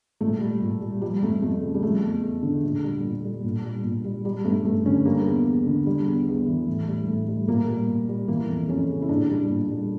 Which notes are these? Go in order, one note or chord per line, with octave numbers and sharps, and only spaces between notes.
A#2 A3
G3
A#2
G3
F3 G3
F2 A3
F2 A3
C#3
G3
F3 A3
E2
E2
D3
A#2
G3
A#2
G3
A#2
G3
A#2
G3
G3
G2 A3
G2 A3
D3 C#4
G3 A#3
E2
E2
D3
G3
E2
E2
E3
A2
G3
A2
G3
A#2 A#3
G3
A#2
G3
E3 A#3
F2
F2 C#4
C#3
E4
A#2 D4
G3
A#2
G3